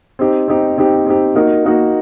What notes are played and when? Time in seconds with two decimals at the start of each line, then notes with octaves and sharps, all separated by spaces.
0.19 C4 D#4 G4
0.48 C4 D#4 G4
0.78 C4 D#4 G4
1.06 C4 D#4 G4
1.35 A#3 D#4 F#4 A#4
1.64 A#3 D#4 F#4 A#4